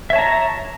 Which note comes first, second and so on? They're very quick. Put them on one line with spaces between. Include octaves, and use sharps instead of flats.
E5 C#5 A5 A#5